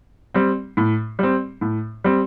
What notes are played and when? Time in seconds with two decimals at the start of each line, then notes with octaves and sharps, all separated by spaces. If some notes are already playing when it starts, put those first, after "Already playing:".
0.34 G3 C4
0.77 A2
1.19 G3 C4
1.61 A2
2.04 G3 C4